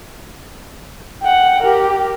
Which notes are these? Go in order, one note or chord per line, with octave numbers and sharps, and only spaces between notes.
F#5 G5
G4 A#4